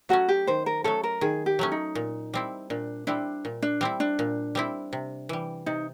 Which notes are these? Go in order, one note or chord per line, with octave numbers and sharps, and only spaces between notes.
F#3 A3 C#4 F#4
G4
D#3 C5
A#4
F#3 A3 C#4 A4
A#4
D#3 G#4
G4
F#3 A3 C#4
D#4
A#2
G3 C4 E4
A#2 D4
G3 C4 D4 E4
A#2
D4
G3 C4 E4
D4
A#2
G3 C4 E4
C3
E3 G3
C3 D#4